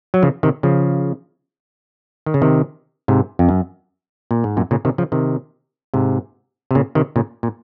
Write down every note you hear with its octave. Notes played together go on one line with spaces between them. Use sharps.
F#3
C#3 F3
C3 D#3
C#3 F3
D#3
C#3
C3 D#3
G#2 C3
F2
F#2
A#2
G#2
F#2 A#2
A#2 C#3
C3 D#3
C#3 F3
C3 D#3
G#2 C3
C3
A#2 C#3
C3 D#3
A#2 C#3
A#2